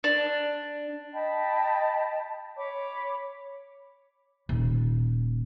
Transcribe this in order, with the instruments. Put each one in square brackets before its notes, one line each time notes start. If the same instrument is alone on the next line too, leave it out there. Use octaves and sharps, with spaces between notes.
[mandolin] D4
[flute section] D#5 G5 A5 B5
C#5 B5 D6
[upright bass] D#1